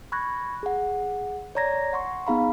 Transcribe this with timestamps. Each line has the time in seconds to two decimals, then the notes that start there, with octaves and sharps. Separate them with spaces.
0.12 B5 C#6 F#6 G#6 A#6
0.63 G#4 F#5
1.55 C#5 D5 A#5 G#6 A#6
1.93 F#5 C6 C#6
2.27 B3 D#4 G#4 F5 A#5 B5